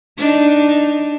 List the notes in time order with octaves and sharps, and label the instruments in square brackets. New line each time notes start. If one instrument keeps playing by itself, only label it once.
[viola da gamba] D4 D#4